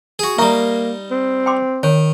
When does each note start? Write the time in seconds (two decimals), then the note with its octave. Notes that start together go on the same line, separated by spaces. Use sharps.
0.19 F#4 G#4
0.39 G3 A#3 D#4 E5 A#5 C#6
1.11 C4
1.46 G5 C6 D6
1.83 D#3 C#5